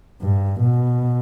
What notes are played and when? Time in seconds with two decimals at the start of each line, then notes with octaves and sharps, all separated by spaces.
0.22 G2
0.60 B2